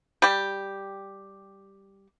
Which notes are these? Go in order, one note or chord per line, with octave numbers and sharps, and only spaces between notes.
G3 G4